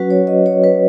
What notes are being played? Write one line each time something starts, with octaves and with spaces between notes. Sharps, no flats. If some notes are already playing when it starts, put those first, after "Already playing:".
Already playing: F#3 C#4 F#4 B4
C#5
D#5
C#5
B4